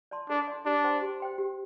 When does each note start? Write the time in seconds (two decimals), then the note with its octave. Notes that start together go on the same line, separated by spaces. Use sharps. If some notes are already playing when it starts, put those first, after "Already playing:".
0.11 D5 A5 C6
0.29 D4 A4
0.48 D5 A5 C6
0.66 D4 G4
0.84 C5 G5 C6
1.02 G4
1.20 C5 G5 C6
1.38 G4